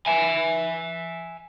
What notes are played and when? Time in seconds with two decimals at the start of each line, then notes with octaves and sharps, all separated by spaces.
0.06 E5 G#5